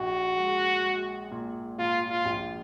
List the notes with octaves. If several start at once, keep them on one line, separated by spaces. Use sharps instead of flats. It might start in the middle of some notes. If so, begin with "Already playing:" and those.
Already playing: A#1 F#4
G#3
G#3
A#2
A#2 F4
F4
A#1